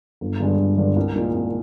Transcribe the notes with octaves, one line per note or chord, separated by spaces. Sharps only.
G1
G2 D3 G#3 D4
G1
G2 D3 G#3 D4
C2
A#2 G#3 D#4
C2